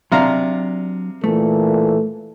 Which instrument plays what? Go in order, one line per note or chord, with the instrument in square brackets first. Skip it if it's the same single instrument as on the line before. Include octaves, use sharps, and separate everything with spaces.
[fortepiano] C3 F5 A#5 [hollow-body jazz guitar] F#3 D4 D5
[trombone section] A#2 E3 A4 [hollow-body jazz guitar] A3